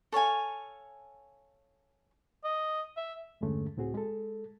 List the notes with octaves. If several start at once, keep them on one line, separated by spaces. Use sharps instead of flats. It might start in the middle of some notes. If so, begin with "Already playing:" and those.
A4 C#5 F5 G#5
D#5
E5
E2 G2 D3 G#3 A3 C#4
C#2 A2 C4 F#4 G#4
G#3 A4